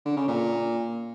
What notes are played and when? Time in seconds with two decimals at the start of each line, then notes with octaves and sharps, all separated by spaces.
0.06 D3
0.17 C#3
0.28 A#2